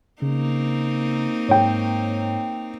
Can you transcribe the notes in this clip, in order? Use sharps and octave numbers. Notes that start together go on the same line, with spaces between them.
C#3 A#3 C4 D#4
G#2 C#5 G5